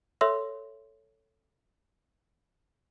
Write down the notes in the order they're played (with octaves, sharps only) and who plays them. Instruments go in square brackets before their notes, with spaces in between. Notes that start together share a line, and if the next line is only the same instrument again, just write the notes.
[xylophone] A4 C#5 E5 C6 E6